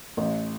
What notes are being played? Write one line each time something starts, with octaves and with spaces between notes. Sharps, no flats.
A1